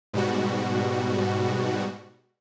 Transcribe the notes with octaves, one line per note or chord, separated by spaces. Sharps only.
G#2 B2 G3 F#4